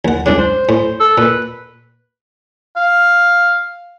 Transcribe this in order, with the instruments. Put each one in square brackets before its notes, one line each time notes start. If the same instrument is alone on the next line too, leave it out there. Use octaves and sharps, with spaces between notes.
[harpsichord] D#2 F#5
[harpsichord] C2 G#2 C#3 [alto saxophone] D4
[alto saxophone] C5
[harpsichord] A2
[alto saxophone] A4
[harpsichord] A#2 [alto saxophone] B4
[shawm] F5